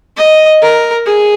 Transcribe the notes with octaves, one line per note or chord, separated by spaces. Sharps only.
D#5
A#4
G#4